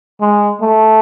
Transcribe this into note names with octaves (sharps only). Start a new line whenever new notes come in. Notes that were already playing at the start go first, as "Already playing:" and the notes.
G#3
A3